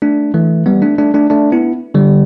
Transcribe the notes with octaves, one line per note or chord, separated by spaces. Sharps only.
A3 D4
E3 A3
G3 B3
A3 D4
A3 D4
A3 D4
A3 D4
B3 E4
D3 G3